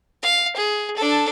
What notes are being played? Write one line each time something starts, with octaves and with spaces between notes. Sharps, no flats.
F5
G#4
D4 A4